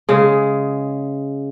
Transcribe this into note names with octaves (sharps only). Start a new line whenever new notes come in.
C#3 G#3